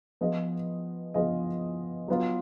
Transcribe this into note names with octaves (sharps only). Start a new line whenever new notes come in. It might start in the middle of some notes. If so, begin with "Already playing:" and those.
F3 B3 F4 G#4 D#5
F3 B3 F4 G#4 D#5
F#3 B3 F4